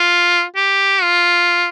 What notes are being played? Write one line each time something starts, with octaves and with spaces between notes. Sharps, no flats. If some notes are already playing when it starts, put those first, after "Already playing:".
Already playing: F4
G4
F4